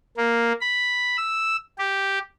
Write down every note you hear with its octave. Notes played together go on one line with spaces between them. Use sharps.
A#3
B5
E6
G4